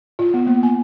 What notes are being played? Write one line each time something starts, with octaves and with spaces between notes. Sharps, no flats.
F4
B3
A#3
G#5